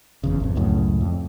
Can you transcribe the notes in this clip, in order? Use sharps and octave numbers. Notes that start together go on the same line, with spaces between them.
F#1 E2 C#3
G#1 F2
C#2 F#2 A2 C#3
F2